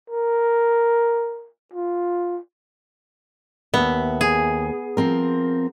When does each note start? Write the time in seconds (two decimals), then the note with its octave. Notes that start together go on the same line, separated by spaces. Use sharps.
0.10 A#4
1.74 F4
3.74 D#2 B3 E5
4.21 G#4
4.97 F3 C4 A#4